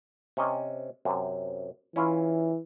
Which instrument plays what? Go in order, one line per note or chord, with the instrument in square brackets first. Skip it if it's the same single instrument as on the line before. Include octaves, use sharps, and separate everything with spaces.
[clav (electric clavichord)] C3 C#4 D#5
F#2 C3
[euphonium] E3 [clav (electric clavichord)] C#4 E4 F4